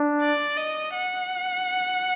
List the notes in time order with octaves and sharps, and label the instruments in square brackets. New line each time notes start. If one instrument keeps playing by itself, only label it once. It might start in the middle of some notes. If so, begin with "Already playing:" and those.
Already playing: [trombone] D4
[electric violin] D5
D#5
F#5